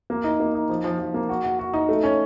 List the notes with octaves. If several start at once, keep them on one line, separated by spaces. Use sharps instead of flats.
A#3
D#4
A#3
D#4
F3
F3
F3
A#3
F#4
F#4
F#4
D#4
A3
C#4